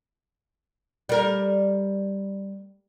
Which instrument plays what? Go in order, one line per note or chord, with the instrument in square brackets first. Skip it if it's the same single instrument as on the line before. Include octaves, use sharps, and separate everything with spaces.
[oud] G3 A#4